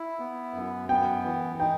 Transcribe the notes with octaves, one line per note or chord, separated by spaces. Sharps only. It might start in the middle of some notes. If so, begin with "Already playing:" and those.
Already playing: E4
B3
F#2
B3 G5
E3
D#4 G5